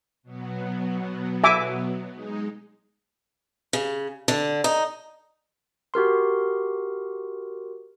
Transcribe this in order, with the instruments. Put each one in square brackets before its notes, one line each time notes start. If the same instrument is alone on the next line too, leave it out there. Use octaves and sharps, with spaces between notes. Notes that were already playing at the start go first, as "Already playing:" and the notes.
[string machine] B2 F#3 B3
[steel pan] E5 G#5 D6
[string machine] G#3 D#4 G#4
[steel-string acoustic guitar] C#3
D3
D#4
[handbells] F#4 G4 A#4 C6